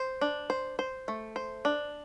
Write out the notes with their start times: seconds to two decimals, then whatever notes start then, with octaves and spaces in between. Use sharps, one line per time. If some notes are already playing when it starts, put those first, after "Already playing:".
Already playing: C5
0.21 D4
0.50 C5
0.79 C5
1.08 A3
1.36 C5
1.65 D4